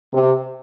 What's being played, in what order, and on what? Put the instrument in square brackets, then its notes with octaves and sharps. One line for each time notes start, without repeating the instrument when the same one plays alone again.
[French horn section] C3